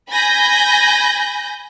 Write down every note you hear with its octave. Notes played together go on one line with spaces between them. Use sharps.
G#5 B5 G6 A#6